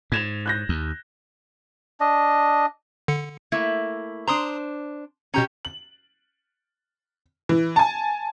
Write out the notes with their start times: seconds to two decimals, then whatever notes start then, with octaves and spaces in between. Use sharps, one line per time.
0.12 G#2 G#6 E7 F7
0.46 F#6 G6 A#6
0.69 D#2
2.00 D4 D#5
3.08 D3 C#7
3.52 A3 A#3 E4
4.28 D4 C5 A#5 C6 D#6
5.34 B2 C#4 G4 A#5
5.65 F#7
7.49 E3
7.76 G#5 A5